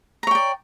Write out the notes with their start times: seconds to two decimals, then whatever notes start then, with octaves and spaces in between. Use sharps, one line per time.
0.23 A#5
0.27 C#5
0.31 G5
0.35 D5